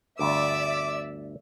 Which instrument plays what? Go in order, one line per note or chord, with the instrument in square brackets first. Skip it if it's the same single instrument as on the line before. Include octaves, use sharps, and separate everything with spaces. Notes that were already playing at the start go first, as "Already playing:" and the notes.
[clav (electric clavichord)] G1 D2 [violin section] D5 E5 [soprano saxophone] D6 [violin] E6